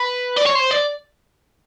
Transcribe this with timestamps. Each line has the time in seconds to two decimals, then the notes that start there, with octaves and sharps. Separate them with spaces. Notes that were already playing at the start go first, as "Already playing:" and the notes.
Already playing: B4
0.37 D5
0.46 C#5
0.55 C5
0.71 D5